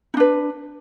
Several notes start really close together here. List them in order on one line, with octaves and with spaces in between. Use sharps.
D#4 D4 B4